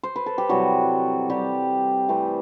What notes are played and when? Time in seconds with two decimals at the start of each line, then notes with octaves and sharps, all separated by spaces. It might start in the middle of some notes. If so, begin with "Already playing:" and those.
0.03 C5
0.16 B4
0.26 A4
0.38 G4
0.49 C3 E3 F#3 G3 F#4
1.30 G3 G4
2.09 E3 A3 C4